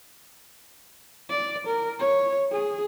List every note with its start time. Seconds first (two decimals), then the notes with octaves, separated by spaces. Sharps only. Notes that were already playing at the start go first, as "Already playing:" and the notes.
1.30 D5
1.67 A#4
2.00 C#5
2.52 G#4